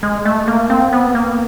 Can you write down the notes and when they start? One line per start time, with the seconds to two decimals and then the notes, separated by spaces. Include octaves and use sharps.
0.03 G#3
0.25 A3
0.48 A#3
0.70 C4
0.93 B3
1.15 A#3